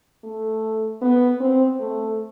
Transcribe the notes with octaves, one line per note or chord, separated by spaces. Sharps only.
A3
B3
C4
A3